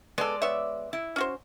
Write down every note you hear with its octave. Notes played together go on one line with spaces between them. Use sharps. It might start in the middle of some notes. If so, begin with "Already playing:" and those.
G#3 B3 A4 D5
B3 C#5 E5
E4
C#4 F#4 C5